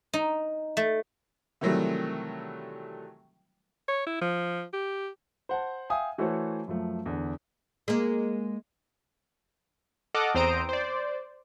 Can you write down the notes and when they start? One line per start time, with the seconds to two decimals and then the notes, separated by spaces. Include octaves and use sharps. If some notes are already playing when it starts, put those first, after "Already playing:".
0.13 D#4
0.77 A3
1.61 C3 D#3 E3 F#3 G3 A3
3.88 C#5
4.06 E4
4.22 F3
4.73 G4
5.49 C5 F#5 A5
5.90 E5 F5 G5 G#5 D#6
6.18 E3 A3 F#4 A4 C5 C#5
6.68 F#2 F3 A3
7.06 E2 D3
7.88 G#3 A#3
10.14 A4 D#5 F#5 D6 F6
10.35 E2 C4 C5 A#5 D#6 D7
10.69 C5 D5